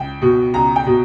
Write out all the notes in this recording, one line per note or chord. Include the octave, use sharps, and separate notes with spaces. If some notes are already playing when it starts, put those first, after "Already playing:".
Already playing: C#2 G5
B2
C#2 A#5
G5
B2